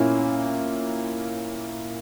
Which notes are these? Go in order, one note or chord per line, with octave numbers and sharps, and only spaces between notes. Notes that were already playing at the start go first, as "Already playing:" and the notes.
Already playing: A#2 A#3 C#4 E4